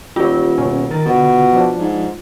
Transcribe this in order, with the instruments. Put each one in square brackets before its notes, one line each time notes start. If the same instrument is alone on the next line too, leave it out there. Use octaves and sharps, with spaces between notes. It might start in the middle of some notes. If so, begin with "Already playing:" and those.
[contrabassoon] D#1 [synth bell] F4 [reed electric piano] G4 C#5
[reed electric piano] B2 C#4
D#3 A#4 A6
[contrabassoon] B2 [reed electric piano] D3
[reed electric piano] F3 D4
[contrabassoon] G#2